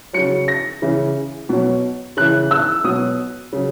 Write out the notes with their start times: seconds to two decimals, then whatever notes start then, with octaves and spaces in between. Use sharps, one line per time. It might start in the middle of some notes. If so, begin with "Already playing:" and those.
0.13 C#3 F#3 C#7
0.48 A#6
0.82 C#3 E3
1.49 B2 F#3
2.17 C#3 E3 F#6
2.51 E6
2.84 B2 F#3 D#6
3.52 C#3 F#3